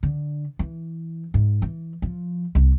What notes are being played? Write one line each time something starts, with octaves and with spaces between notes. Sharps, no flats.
D3
E3
G#2
E3
F3
C2